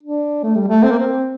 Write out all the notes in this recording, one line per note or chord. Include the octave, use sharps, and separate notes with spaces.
D4
A3
G3
A3
C4
A#3
C4